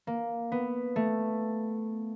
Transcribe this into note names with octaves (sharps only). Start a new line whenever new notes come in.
A#3
B3
A3